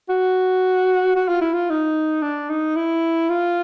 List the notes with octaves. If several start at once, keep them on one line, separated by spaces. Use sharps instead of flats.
F#4
F#4
F4
E4
F4
D#4
D4
D#4
E4
F4